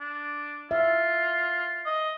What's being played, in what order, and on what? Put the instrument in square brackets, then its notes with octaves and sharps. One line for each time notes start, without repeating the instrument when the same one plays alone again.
[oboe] D4
[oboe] F4 [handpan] E5
[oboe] D#5